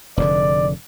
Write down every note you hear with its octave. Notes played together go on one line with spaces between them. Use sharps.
F1 G#2 D3 D5